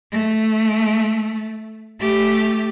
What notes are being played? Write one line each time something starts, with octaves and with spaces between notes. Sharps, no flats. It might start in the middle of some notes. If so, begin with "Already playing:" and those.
A3
A3 G4